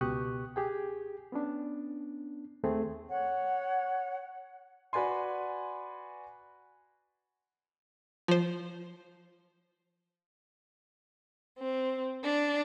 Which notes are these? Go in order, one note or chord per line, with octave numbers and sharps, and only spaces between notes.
C#2 B2 G4 C#6 D#6 F#6
G4 G#4 G5
B3 C#4 D4
D#2 A3 C4 G#4
C#5 F#5
F#4 B4 D5 G#5 C6
F3 C5
C4
D4